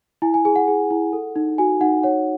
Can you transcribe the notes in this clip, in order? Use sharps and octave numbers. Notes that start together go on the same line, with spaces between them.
E4 G#5
G#5
G#4 G#5
F#5
G#4
E4
A4
D#4
F#4 G#5
D#4 F#5
C#5 F#5